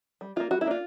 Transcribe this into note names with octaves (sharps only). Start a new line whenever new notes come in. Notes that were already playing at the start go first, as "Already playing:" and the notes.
G3
A#3 D4 F4
G3 F#4
E4
A#3 D4 F4